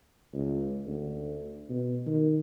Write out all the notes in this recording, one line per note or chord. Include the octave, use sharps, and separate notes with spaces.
C#2
D2
B2
D#3